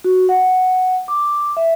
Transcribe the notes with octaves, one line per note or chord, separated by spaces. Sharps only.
F#4
F#5
D6
E5